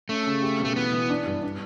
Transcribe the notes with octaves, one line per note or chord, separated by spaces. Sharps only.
A3 C#4
C#3
G4
B2
A3
E3 B3
E3
D4
G2
D4